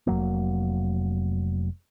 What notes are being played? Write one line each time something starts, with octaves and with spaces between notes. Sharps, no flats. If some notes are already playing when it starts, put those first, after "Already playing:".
F1 F#3 A#3